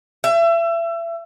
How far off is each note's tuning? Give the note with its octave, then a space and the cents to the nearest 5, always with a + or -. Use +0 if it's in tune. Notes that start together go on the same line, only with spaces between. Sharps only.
E5 +30